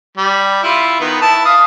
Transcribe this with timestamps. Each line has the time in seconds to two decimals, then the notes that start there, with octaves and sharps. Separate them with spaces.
0.17 G3
0.63 E4 F4
1.00 D#3 B3
1.21 E4 A5
1.45 F5 D#6